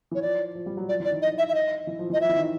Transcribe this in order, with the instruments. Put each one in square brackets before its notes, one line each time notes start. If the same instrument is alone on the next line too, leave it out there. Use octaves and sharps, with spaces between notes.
[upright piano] E3 [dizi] C#5
[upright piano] F3 [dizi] D5
[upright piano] F3
G3
F#3
[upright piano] F3 [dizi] D5
[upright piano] E3
[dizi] D5
[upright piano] D#3
[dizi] D#5
E5
E5
D#5
[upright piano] E3
F3
E3
[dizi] D#5
[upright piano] F3 [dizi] E5
[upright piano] E3
D#3